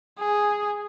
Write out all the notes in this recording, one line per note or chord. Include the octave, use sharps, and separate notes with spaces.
G#4